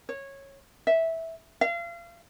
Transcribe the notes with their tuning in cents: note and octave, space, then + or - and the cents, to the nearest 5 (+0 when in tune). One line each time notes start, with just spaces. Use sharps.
C#5 -15
E5 -10
F5 -35